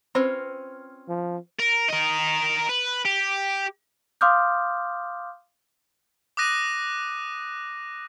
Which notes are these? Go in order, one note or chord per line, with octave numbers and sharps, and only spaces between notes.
C4 C#4 F4 B4 C5 B5
F3
A#4
A#4 D#5
B4
G4
F5 C6 D6 D#6 F6 G6
D6 D#6 F#6 A#6 D#7